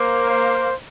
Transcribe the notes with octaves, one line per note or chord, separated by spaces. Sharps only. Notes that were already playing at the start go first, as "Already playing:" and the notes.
Already playing: A#3 C5
C5